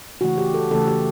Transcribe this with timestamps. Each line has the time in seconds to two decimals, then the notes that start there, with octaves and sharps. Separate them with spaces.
0.21 C#3 E3 A3 F#4
0.38 G4
0.54 A4
0.71 C#3 E3 A3 A4
0.88 G4